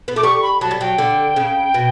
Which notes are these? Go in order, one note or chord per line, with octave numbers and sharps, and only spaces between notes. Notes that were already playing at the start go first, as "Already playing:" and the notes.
B3
A3 D6
G3 C#6
B5
F#3 A5
G3
F#3 G5
D3
C#3
B2